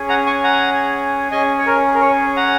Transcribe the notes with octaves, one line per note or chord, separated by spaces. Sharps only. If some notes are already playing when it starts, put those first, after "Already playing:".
Already playing: C#4 G#4
F#5 A#5
G#5 C#6
F#5 A#5
C#4 G#4 D#5 G#5
C#5
A#4
A#4
C#5
F#5 A#5